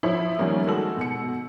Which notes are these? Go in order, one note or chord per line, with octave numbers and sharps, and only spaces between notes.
F3 E4 C#5
D#3 F3 G3 A#3 C#4 A#4
D#3 G#3 F#4 A4 E6 F#7
B2 C#7